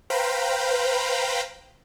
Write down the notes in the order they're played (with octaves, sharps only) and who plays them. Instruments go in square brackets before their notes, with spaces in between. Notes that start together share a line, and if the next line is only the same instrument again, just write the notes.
[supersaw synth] B4 C5 F5 G5 A#5 B5